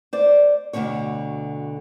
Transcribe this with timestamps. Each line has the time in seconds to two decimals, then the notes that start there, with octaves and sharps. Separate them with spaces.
0.13 C5 D5
0.73 D2 G2 B2 D3 C#5